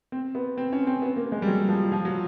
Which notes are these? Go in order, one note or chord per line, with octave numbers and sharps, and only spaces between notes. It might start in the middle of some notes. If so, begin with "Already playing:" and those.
C4
B3
C4
C#4
C4
B3
A#3
G#3
G3
F#3
F3
F3
F#3